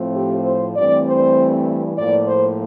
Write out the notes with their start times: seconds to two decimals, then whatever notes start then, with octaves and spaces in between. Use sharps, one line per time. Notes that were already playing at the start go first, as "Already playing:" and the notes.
Already playing: A2 F3 A3 C4
0.15 G4
0.45 C5
0.76 G2 E3 A3 C4 D5
1.06 C5
1.97 A2 F3 A#3 D5
2.27 C5